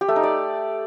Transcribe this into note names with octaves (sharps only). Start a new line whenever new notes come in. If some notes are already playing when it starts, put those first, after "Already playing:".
G4
A3
D#4
D5